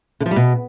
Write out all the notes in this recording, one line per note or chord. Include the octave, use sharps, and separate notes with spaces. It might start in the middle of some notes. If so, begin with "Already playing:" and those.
D3
F3
G3
B2